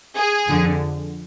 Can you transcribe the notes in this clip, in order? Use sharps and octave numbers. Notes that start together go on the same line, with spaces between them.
G#4
F2 D3